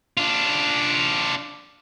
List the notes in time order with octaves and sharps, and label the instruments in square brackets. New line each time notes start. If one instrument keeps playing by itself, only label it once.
[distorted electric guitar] D4 F4